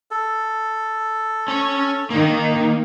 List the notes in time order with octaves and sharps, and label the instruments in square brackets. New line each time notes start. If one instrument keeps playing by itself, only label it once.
[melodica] A4
[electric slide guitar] C#4 C#5
[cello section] D#3 D#4 [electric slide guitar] A#3